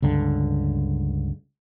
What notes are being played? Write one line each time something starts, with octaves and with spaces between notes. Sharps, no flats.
C#2 G2 D3